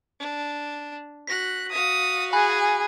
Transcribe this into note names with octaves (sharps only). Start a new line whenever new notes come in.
D4
F#4 F#6 A#6 B6
F#4 F5 D#6
G#4 G#5 B5 F#6